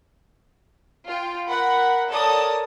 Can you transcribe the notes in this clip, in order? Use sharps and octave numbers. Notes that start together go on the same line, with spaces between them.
F4 G5
A#4 F#5 B5
A4 A#4 C#5 D5 A5 D#6